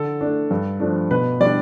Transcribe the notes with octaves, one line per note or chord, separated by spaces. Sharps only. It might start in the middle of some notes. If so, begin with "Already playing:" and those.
Already playing: D3 A4
A3 D4
G2
F3 A3 D4
B2 B4
G3 D4 D5